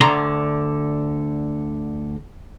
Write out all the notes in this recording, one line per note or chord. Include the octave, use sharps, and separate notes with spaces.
D2 D3 A#5 C6